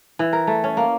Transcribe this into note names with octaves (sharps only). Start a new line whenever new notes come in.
E3
A#4
A3
C#4
A#3